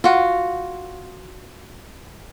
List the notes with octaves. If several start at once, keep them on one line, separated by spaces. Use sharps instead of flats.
F4 F#4